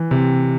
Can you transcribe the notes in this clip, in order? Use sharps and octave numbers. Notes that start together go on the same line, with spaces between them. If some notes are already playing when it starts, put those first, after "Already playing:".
Already playing: E3
C3